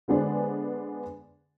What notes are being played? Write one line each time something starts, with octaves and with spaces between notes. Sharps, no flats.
D3 G#3 B3 D4 G#4 C5